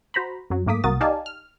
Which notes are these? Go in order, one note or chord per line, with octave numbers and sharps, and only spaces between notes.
F#4 C5 A#5 B5
F#2 F#3
G#2 A3 A#3 D6 D#6 B6
C2 A#3 F#4 A#4 D#6 A6
D#4 G4 D5 F5 G#5 A5
F6